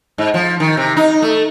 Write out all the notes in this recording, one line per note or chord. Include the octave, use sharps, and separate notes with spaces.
G#2
F3
D#3
C3
D#4
A3